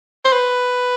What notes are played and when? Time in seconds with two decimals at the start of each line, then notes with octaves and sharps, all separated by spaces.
0.25 C5
0.32 B4